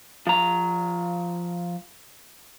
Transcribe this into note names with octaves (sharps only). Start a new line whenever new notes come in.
F3 A#5